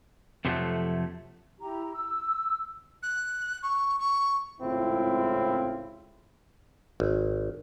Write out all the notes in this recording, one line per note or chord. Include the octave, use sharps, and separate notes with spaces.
F2 C3 F3 F#3 A3
E4 G4 A#5
E6
F#6
C#6
C#6
G#1 C#2 A2 C4 E4 F4
G#1